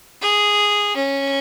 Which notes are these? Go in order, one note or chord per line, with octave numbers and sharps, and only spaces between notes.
G#4
C#4